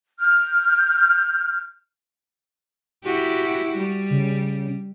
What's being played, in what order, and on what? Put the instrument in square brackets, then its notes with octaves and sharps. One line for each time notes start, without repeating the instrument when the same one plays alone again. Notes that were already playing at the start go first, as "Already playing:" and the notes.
[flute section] F6 G6
[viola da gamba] E4 F#4 G4
G3
[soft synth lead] C#3